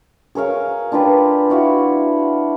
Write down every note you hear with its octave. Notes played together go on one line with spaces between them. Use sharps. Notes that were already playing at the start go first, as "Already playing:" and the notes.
G#4 A#4 C#5 F5
D4 F4 G4 B4
E4 F#4 F5